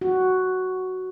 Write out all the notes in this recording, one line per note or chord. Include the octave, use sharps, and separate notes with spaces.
F#4